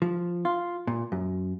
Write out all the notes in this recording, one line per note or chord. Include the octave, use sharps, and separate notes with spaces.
F3
F4
A#2
F#2